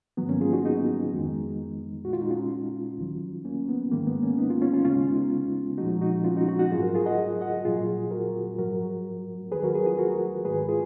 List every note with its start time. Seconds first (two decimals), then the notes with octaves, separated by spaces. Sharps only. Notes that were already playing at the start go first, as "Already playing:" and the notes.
0.17 G#2 D#3 F#3 B3
0.29 A#3 C#4
0.41 F4 G#4
0.53 D#4 F#4
0.65 B3 D#4
1.11 F2 D#3 G#3
2.04 A#2 G#3 F#4
2.13 F4
2.22 D#4
2.30 C#4 F4
2.98 D#2 D#3 F#3
3.45 A#3 C#4
3.69 B3
3.92 G#2 D#3 G#3 A#3
4.07 B3
4.23 A#3 C#4
4.38 B3 D#4
4.50 C#4 F4
4.61 C#4 F4
4.74 C#4 F4
4.85 D#2 C#3 G#3 C#4 F4
5.08 B3 D#4
5.78 A#2 F3 G#3 D#4 F#4
6.01 D#4 F#4
6.24 C#4 F4
6.37 D#4 F#4
6.48 D#4 F#4
6.59 D#4 F#4
6.71 G#2 F#3 F4 G#4
6.83 F#4 A#4
6.95 F4 G#4
7.06 D#5 F#5
7.41 D#5 F#5
7.64 A#2 F#3 F4 G#4
8.11 F#4 A#4
8.58 G#2 F#3 F#4 A#4
9.52 D#2 D#3 F#3 G#4 B4
9.64 F#4 A#4
9.75 G#4 B4
9.86 F4 G#4
9.98 F#4 A#4
10.45 G#2 D#3 G#3 G#4 B4
10.68 F4 G#4